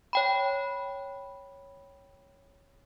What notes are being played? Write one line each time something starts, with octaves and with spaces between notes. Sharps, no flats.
C#5 G5 B5